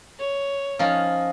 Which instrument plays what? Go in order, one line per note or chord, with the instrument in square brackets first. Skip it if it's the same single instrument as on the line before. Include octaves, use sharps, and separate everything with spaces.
[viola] C#5
[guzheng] F3 C#4 D#4